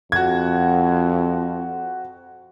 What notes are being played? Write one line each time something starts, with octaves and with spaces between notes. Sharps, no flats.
F2 F#4 G#6